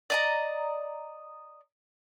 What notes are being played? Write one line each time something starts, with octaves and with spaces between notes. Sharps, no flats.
D5 D#5 A#5